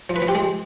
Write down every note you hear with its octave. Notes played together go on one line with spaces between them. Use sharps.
F3
B4
F3
G4
G#3